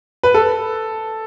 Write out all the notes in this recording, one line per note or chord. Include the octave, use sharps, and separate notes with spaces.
B4
A4